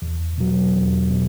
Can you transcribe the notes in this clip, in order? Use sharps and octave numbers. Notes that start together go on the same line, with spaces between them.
E2
B2 F#3
E2
B2